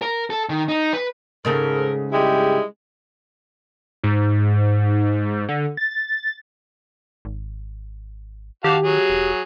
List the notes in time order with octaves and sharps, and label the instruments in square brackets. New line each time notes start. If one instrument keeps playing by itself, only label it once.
[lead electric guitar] A#4
A4
D#3
D#4
B4
[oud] G#2 C#3 A3 [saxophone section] A4 A#4
[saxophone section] G3 G#3 E4 [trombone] G4
[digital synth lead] G#2
D3
A6
[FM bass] G#1
[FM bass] D#3 [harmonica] F#4 F5 A5 [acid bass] G4
[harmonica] F#3 G#4
[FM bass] E1